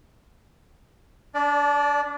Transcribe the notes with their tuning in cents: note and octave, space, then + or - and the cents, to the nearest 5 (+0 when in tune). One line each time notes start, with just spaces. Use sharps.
D4 -25 D5 +0